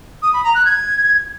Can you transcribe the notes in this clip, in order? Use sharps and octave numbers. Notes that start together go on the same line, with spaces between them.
D#6
B5
A#5
F#6
G#6